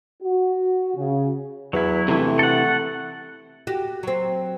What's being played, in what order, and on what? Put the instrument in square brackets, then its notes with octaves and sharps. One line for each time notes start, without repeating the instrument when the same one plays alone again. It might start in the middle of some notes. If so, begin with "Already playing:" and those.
[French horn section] F#4
C#3
[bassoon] E2 [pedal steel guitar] F#3 E4
[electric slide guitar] C3 E3 [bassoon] A3
[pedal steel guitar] A4 F#5
[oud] F#4 G4
F#3 C4